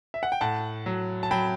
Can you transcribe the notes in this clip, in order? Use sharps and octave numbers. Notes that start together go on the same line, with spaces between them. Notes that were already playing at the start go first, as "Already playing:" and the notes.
E5
F#5
G5
A2 F#5 A5
F#3
A5
F#3 G5 B5